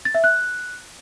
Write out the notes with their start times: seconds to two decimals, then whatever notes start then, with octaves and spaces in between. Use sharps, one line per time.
0.05 A6
0.15 E5
0.24 F#6